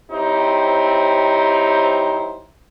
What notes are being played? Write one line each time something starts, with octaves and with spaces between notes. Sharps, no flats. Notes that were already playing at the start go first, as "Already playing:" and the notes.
F#3 C4 D#4 E4 G4 C5